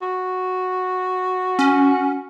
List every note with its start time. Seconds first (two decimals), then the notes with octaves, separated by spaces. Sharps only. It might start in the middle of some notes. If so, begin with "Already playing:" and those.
0.02 F#4
1.59 C#4